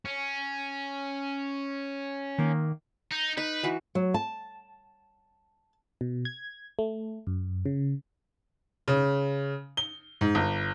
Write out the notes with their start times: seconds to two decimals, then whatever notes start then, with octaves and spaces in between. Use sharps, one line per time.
0.05 C#4
2.38 D#3 A#3
3.11 D#4
3.37 D#4 B4
3.64 E3 F#4
3.95 F#3
4.14 A5
6.01 B2
6.25 G#6
6.79 A3
7.27 F#2
7.66 C#3
8.88 C#3
9.77 G7
10.21 G#2
10.35 G1